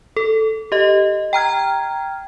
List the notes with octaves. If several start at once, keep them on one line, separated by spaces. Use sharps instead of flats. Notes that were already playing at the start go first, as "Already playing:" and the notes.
A4
G4 D#5
G5 A#5 F6 G#6